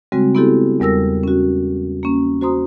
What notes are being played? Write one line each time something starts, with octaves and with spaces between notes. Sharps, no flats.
C#3 G3 G#3 C4 F#4
B3 C4 E4 F#4 G4 A4
E2 G3 A#4 E6 A#6
C#4 F#4
A#3 C#4
F#4 C5 A#5 C6 D#6